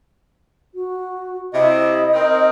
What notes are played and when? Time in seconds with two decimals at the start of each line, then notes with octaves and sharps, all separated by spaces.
0.74 F#4
1.53 C3 E4 D#5
2.14 C4 D#4 A#4